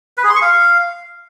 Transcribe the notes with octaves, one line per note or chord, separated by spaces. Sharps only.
B4
G#4
C6
C#6
F5